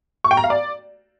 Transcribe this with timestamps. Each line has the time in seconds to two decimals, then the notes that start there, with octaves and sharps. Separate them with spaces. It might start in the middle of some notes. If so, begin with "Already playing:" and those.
0.24 C#6
0.31 G5
0.37 A#5
0.44 F5
0.50 D5